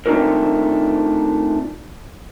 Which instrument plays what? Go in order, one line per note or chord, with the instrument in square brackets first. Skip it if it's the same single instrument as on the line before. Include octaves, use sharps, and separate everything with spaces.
[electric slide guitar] A3 C4 D4 D#4 F4 A#4